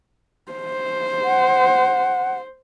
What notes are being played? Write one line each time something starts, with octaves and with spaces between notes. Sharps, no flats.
C5
F#5